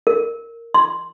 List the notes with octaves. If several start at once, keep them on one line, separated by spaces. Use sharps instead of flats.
A#4
C6